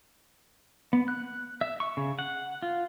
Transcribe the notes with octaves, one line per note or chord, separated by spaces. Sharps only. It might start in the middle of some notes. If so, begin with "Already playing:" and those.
B3
F#6
E5
C#6
C#3
F#5
F4